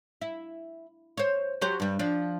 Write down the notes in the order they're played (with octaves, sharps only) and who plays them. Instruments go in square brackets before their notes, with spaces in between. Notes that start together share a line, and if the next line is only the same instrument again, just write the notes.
[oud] E4
C5 C#5
F#3 G4 C5
G2 G3
F3 D4